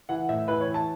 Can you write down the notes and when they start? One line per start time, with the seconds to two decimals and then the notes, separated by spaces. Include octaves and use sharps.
0.09 E3 F#5
0.29 A2 E5
0.48 E3 B4
0.61 C#5
0.68 E3
0.74 A5